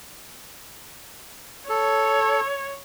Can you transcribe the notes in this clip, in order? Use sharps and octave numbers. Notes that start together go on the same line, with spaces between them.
A4 C#5